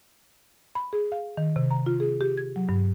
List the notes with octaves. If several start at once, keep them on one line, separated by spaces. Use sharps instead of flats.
B5
G#4
F5
D#3
C3
A#5
F4
G#4
G4
G#6
F#3
G2